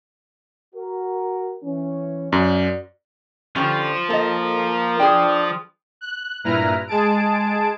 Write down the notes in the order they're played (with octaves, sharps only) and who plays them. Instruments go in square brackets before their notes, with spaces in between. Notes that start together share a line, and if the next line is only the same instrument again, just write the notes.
[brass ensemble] F#4 A#4
E3 C#4
[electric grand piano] F#2 [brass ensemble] C#4 F#4 D5
[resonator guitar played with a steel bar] D3 G3 C#4 [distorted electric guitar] F3 F4
[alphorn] A#3 [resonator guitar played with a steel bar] A4 D#5
[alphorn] D4 [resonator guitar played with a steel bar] G#4 B4 G5
[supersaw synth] F#6
G2 A#2 E4 B4 A#5 F6
G#3 G#4 A5 D7